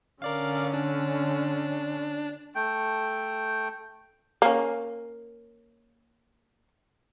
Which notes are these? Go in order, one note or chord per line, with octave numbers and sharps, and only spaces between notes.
D3 C#4 A#4 D5 F5
D4
A3 G5
A#3 C#4